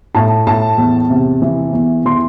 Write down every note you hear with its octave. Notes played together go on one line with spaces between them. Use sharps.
A2 A5
A2 A5
E2
C3
E3
E2
E3 C6